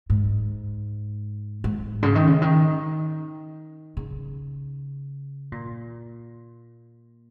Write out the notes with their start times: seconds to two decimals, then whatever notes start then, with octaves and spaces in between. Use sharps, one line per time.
0.10 G#2
1.64 G#2
2.03 C#3
2.15 D#3
2.27 C#3
2.42 D#3
3.97 C#3
5.52 A#2